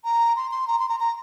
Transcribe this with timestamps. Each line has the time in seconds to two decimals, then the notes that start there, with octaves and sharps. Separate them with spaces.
0.04 A#5
0.36 C6
0.51 C6
0.68 A#5
0.79 C6
0.89 A#5
1.00 A#5